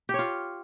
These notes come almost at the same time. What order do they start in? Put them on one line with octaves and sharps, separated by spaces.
G4 C#5 F4